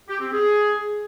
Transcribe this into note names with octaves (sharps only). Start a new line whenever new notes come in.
G4
C4
G#4